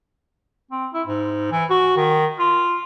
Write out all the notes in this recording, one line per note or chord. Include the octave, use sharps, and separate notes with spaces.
C4
E4
G#2
E3
F#4
D#3
F4